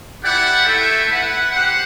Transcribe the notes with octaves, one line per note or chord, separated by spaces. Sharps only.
E4 G4 D5 F#5
A3 E4 A4 E5 G5
E4 B4 F#5
G4 C5 F#5